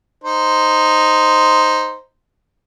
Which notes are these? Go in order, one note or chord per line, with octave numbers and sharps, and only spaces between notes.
D#4 C5